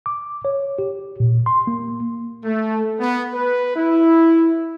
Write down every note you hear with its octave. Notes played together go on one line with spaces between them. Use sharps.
D6
C#5
G4
A#2
C6
A#3
A3
B3
B4
E4